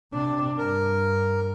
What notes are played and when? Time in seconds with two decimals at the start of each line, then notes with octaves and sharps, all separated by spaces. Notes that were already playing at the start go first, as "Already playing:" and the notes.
0.13 C3 D4
0.58 G2 A#4